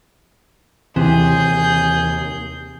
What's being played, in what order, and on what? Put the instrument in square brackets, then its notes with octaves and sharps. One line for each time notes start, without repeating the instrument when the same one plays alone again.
[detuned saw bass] D#2 [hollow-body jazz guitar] C3 [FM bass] E3 [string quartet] G#4 G6